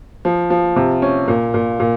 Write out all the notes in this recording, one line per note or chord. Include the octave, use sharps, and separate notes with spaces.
F3
F3
C3
C#4
A#2
A#2
A#2